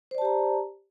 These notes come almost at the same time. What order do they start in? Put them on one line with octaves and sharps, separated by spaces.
C5 D5 A5 G4 A#5